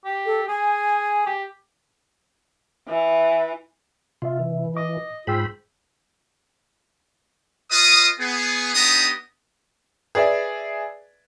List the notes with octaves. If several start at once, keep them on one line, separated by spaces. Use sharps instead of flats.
G4
A4
G#4 G#5
G4
E3
C3 F4 D#5 E5
E3
D#5 D6
G#2 F4 G#4 C5 G5 B5 E6
F4 B4 D#5 D#6
B3 G#4
B3 D4 D#4 G4 A#5 D#6
G#4 B4 D5 E5